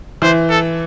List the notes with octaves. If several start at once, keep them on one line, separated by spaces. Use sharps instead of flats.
E3 C5
A4